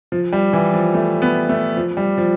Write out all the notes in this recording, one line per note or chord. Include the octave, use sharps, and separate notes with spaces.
F3
G3
E3
F3
A3
B3
A3
F3
G3
F3